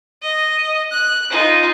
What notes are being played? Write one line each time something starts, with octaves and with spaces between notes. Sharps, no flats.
D#5
F#6
D#4 F4